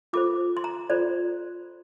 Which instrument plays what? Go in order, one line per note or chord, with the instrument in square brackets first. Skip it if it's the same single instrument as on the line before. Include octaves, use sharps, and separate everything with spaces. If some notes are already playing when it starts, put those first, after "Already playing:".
[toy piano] F4 A4 C5 D6
C6
A#5
F4 A4 C5 D5